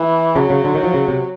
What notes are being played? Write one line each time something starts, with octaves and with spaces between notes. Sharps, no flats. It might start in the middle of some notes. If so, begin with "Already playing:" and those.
Already playing: E3
C#3 F#3
C#3
D3
D#3
F3
C#3
C3